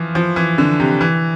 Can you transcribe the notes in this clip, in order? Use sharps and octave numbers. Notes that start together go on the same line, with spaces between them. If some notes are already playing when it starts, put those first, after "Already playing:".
Already playing: E3 F3
F3
E3
D3
C3
E3